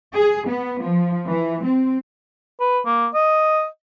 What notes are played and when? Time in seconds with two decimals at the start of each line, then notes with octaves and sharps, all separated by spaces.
0.14 G#4
0.48 B3
0.81 F3
1.28 E3
1.66 C4
2.60 B4
2.86 A#3
3.14 D#5